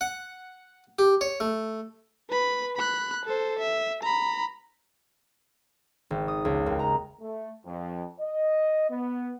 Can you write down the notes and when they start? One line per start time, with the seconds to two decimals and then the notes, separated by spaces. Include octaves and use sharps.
0.01 F#5
0.99 G4
1.21 C#5
1.40 A3
2.30 B4 B5
2.77 B5 F#6
3.25 A4 C5
3.59 E5
4.03 A#5 B5
6.11 G#1
6.28 D#6
6.45 C#2
6.66 D#2
6.79 A#5
7.21 A3
7.66 F2
8.20 D#5
8.89 B3